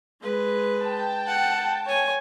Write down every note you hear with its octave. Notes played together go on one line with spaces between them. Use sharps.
G#3 B4
G5 A5
F#5
C#5 G#5